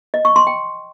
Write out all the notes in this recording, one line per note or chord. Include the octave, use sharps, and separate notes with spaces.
D#5
C#6
C6
G5